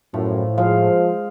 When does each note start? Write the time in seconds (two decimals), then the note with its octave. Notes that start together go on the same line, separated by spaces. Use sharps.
0.14 F#2 A2 F3
0.58 F3 G#3 C5 F5